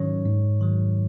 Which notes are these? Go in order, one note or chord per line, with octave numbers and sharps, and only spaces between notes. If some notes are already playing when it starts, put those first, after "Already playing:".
Already playing: G#2 D#3 F#3 C#4 C#5
G#2
D#3 F#3